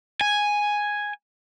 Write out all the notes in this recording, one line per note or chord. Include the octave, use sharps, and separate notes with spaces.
G#5